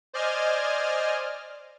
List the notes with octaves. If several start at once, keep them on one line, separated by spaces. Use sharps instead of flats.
C5 D5 D#5 G#5 F6